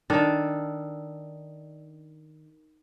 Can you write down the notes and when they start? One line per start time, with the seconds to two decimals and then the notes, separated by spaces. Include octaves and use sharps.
0.10 D#3 D4 A4